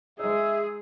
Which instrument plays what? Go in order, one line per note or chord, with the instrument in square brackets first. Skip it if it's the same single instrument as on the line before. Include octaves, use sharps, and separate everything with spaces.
[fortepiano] G#3 D#4 [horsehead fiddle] G#4 [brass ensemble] E5 [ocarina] E6